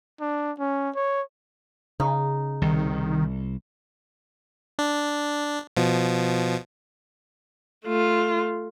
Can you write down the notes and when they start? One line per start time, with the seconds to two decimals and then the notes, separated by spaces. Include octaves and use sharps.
0.20 D4
0.59 C#4
0.96 C#5
2.00 C#3 D#4
2.62 C2 D#3
4.79 D4
5.77 B2 F3
7.86 A3 F4